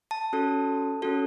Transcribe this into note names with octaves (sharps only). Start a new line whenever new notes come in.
A5
C#4 F#4 A4
C#4 F#4 A4